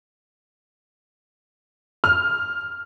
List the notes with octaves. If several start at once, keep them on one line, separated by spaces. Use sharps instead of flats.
F6